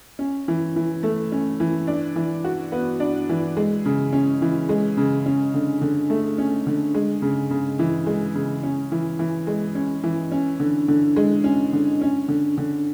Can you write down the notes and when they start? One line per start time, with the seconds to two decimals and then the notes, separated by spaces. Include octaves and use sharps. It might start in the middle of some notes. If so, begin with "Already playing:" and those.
0.19 C#4
0.48 E3
0.76 E3
1.03 A3
1.32 C#4
1.60 E3
1.87 D4
2.16 E3
2.44 F#4
2.72 B3
3.00 D4
3.29 E3
3.57 G#3
3.86 C#3
4.13 C#4
4.42 E3
4.69 G#3
4.97 C#3
5.26 C#4
5.54 D3
5.81 D3
6.10 A3
6.38 C#4
6.67 D3
6.94 G#3
7.22 C#3
7.50 C#3
7.79 E3
8.06 G#3
8.35 C#3
8.63 C#4
8.92 E3
9.19 E3
9.47 G#3
9.75 C#4
10.03 E3
10.32 C#4
10.60 D3
10.88 D3
11.16 G#3
11.44 C#4
11.73 D3
12.01 C#4
12.28 D3
12.57 D3